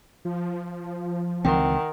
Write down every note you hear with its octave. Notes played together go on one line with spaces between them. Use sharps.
F3
C#2 D#3 E3 C4 F#5 G5